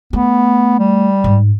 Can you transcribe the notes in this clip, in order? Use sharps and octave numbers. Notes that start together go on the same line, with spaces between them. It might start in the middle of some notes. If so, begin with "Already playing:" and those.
A3 B3
G3
G#2